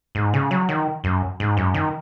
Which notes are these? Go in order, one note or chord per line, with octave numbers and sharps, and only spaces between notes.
G#2
C#3
F#3
D#3
F#2
G#2
F#2
D#3